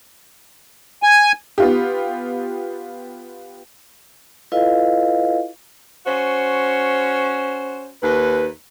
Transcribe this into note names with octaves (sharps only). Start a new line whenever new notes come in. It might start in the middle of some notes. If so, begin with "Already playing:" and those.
G#5
B3 F4 G4
E4 F4 A4 B4 D#5 F5
C#4 F#4 C5
D#2 B4